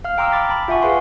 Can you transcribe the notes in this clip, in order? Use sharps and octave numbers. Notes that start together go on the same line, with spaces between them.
F5 F6
G5 A#5 C6 D6 E6 F6
B5 D6 A6 B6
G5 A5 B5
F4 E5 F#5 G#5 C#6
G#4 B4 F5 G#5 C6